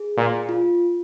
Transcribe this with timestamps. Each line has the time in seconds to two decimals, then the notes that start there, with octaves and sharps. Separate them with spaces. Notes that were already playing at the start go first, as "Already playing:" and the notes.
Already playing: G#4
0.17 A#2
0.49 F4